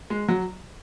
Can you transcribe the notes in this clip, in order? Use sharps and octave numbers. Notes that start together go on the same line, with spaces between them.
G#3
F#3